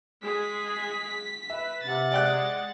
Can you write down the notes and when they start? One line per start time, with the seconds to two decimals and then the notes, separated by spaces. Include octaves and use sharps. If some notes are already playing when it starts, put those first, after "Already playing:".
0.23 G#3 G#4 B6
1.50 B4 E5
1.83 C3 F#5 A6
2.12 G#3 D5 G5 F#6